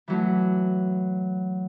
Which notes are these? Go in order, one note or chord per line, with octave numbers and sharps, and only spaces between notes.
E3 F#3 A3